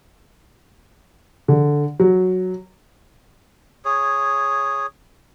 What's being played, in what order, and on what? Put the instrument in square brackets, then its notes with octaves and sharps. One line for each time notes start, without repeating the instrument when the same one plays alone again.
[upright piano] D3
F#3
[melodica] G#4 C#5